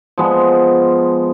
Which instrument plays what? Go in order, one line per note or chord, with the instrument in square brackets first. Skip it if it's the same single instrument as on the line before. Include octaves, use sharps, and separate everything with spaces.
[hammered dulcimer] F3 G#3 B3